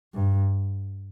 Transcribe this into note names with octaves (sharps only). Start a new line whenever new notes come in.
G2